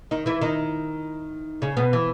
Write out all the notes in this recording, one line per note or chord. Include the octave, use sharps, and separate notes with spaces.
D#3 D#4
E3 E4
D#3 D#4
C#3 C#4
B2 B3
E3